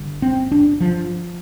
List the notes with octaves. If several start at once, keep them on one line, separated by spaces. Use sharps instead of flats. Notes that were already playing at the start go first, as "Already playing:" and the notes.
Already playing: G1 G2 D3
C4
D4
F3